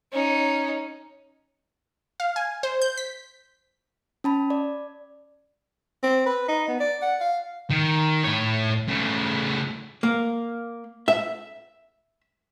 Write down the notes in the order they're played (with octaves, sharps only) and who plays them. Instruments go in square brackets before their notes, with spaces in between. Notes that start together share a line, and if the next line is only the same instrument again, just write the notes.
[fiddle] C#4 D#4
[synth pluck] F5
G#5
C5
G6
B6
[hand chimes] C#4 A5 B5
D5
[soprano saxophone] C4
B4
D#4
B3
D5
F#5
F5
[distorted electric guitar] D#3
A2 C#5
C#3 A3
[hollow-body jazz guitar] A#3
E5